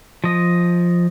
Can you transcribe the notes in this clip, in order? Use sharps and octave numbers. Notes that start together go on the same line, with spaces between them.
F3 D#5